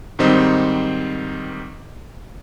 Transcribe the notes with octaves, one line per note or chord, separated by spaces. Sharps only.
G#2 D#3 G3 C4 D#4